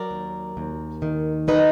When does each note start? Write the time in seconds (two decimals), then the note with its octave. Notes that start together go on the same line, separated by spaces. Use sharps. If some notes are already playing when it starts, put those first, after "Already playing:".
Already playing: F#3 A#4 D5
0.11 D#2
0.57 D#2
1.02 D#3
1.48 D#4 B4 D#5